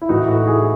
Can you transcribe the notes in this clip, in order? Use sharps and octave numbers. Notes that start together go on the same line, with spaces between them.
E4
A2 E3 D#4 F#4
F#4 A4
E4 G#4